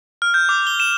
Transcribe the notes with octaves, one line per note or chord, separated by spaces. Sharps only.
F6
G6
D6
G7
E7